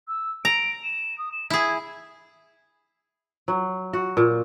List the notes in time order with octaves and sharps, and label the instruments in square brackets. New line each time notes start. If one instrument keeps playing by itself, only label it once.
[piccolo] E6
[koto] A#5 [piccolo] D7
[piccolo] E7
D#6
E7
[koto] E4 G#4 [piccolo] G#6
[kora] F#3
F#4
A#2